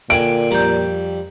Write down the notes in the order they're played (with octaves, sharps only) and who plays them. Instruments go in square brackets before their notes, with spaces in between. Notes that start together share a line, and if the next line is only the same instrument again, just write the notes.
[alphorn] A#2 [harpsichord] D3 G#5 [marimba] G5 [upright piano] D7
[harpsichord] F2 G3 [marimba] A#5 G6